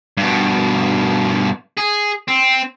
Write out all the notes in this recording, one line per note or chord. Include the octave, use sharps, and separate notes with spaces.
G2 B2
G#4
C4